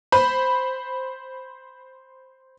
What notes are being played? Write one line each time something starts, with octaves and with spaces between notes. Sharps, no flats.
C5 B5